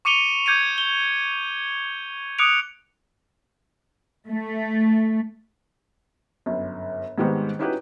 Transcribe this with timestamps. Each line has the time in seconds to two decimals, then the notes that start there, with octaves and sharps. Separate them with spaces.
0.05 C#6 D6 C#7 D#7 F7 G7
0.46 D6 G6 G#6 C#7 D#7
0.78 G7
2.39 D6 D#6 F#6 C#7 D7 F7
4.29 A3
6.46 G1 F#2
7.18 G#2 D#3 G3 B3 C4
7.59 C#4 D#4 E4 F#4 G4 B4